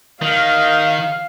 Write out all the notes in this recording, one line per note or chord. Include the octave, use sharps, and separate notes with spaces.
D#3 F5